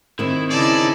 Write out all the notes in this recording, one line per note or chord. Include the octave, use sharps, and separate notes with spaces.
D#3 C4 E4
C#3 D#4 E4 G#4 D5 A5